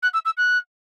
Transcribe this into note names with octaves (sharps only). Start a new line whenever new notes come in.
F#6
E6
E6
F#6